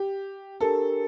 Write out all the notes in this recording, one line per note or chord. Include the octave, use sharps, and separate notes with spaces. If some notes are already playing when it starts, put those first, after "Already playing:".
Already playing: G4
D4 G4 A4 A#4